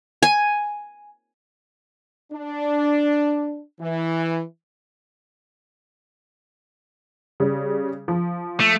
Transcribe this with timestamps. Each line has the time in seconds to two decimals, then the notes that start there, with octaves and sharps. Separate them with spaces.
0.23 G#5
2.33 D4
3.81 E3
7.40 C#3 G3
8.08 F3
8.60 A3